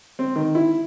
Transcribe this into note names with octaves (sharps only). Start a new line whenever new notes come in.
C4
D#3
E4